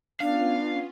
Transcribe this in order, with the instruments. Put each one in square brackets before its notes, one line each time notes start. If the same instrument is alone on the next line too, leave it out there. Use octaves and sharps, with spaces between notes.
[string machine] B3 C#4 F4 [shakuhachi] D4 [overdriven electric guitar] F5